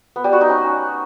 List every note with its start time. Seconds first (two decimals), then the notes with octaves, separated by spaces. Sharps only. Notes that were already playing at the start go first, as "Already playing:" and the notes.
0.16 B3
0.24 G3
0.33 F#4
0.41 D#4
0.50 C#4